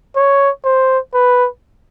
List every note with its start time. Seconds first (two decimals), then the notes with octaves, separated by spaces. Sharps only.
0.16 C#5
0.65 C5
1.14 B4